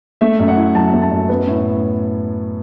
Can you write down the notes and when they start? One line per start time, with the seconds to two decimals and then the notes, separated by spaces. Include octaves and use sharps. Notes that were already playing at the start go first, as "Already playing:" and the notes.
0.21 A3 E5
0.40 F#2
0.48 F#5
0.57 E4
0.75 F#3 A5
0.94 A3
1.02 A5
1.11 F#2
1.29 B3
1.47 A2